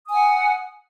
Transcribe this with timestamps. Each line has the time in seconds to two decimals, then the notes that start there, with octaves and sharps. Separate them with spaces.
0.06 D#6
0.10 G#5
0.14 F#5